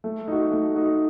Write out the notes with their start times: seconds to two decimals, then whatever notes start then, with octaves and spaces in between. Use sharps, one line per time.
0.04 A3
0.28 D#4 F#4
0.51 A3
0.75 D#4 F#4